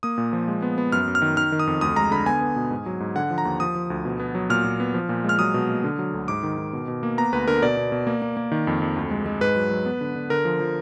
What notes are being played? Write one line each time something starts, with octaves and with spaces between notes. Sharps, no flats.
A#3 D#6
A#2
F3
G#3
B3
B3
F#2 F6
F#2
F6
D#3
D#3 F6
D#3
D#6
F2
D2 D#6
G#3 A#5
D3 B5
B3 G#5
B3
B2
G#2
F#3
G#2
D3 F#5
F3
A#5
D#2
F3 D#6
F3
D2
B2
B3
F#3
A#2 F6
A#2
B3
F3
A#2
G#3 F6
F#3 D#6
B2
A#3
D3
F#3
D2
G#2 D6
D#3
D#3
B2
B2
A#3
B3 A#5
D2 B4
D3 A#4
B2 D5
B2
B2
A#3
A#3
A#3
D#3
F2
F2
D2
G#3
G#3
G#2 B4
F#3
F#3
B3
D3
D3
D3 A#4
F3
F3